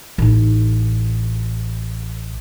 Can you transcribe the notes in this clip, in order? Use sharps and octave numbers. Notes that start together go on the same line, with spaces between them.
A1 D#4